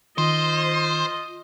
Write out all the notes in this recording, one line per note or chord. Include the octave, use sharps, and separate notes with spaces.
D#3 F4 C5 D#5